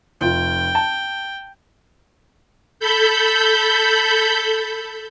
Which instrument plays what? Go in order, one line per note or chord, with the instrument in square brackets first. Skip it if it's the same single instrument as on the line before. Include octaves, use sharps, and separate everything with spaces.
[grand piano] F1 F4 [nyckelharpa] G5
[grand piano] A5
[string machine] A4 B5 G6